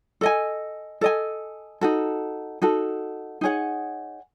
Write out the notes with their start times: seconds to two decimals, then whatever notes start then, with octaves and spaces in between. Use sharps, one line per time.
0.21 A4 D#5 G#5
1.01 A4 D#5 G#5
1.81 D#4 F#4 A4
2.62 D#4 F#4 A4
3.41 D#4 G#4 C#5 F#5